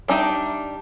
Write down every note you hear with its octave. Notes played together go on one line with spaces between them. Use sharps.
G3 D4 D#4 E5